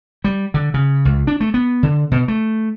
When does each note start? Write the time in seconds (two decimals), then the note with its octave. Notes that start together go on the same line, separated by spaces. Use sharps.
0.24 G3
0.54 D3
0.74 C#3
1.05 C#2
1.27 D4
1.40 A3
1.54 B3
1.83 D3
2.11 B2
2.28 A3